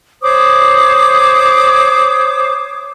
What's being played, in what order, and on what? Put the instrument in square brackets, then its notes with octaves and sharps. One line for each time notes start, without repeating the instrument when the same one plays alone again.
[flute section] C5 C#5 D6 D#6